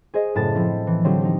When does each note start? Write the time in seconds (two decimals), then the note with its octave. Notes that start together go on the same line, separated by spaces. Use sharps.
0.14 G#4 C5 D#5
0.35 F#1 A2 A5 A6
0.55 F3 C4 E4
0.87 E3
1.04 D3 F3 F#3 C4 G4
1.21 D#4 G4